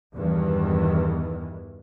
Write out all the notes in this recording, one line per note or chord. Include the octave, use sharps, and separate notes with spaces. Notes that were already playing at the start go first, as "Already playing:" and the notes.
E2 G2 D#3 E3